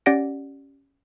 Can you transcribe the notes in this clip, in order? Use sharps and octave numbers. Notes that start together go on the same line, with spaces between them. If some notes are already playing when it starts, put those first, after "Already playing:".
C#4 G4 D5 F#5 A#6 D7